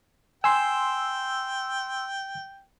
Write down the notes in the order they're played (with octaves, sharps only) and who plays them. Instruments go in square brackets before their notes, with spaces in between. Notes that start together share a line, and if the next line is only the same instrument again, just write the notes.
[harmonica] G5 [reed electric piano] G#5 [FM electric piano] C6 E6